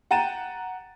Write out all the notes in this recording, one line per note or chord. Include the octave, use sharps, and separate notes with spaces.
F#5 G5 A#5 A6 D#7 E7